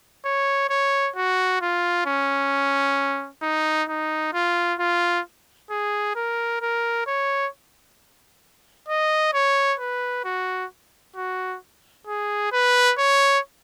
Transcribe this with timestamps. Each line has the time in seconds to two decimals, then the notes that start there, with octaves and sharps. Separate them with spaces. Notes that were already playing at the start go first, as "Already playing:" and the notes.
0.25 C#5
0.69 C#5
1.16 F#4
1.61 F4
2.06 C#4
3.42 D#4
3.89 D#4
4.33 F4
4.79 F4
5.70 G#4
6.16 A#4
6.61 A#4
7.06 C#5
8.88 D#5
9.34 C#5
9.79 B4
10.24 F#4
11.16 F#4
12.07 G#4
12.52 B4
12.98 C#5